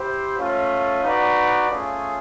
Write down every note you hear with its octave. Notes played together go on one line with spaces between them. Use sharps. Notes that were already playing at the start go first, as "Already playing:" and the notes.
Already playing: E4 G4 C5
A3 C#4 F4
D#4 F#4 B4 D5
A3 C#4 F4 G#4